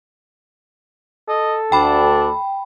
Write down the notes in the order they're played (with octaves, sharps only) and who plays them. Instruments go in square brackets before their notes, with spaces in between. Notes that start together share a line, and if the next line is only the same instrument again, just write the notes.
[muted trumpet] A4 [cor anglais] D#5
[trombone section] D2 [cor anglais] D4 [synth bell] G5 B5